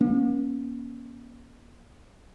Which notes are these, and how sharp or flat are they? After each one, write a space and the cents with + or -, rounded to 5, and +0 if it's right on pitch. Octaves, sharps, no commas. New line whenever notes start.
A#3 +40 C#4 +0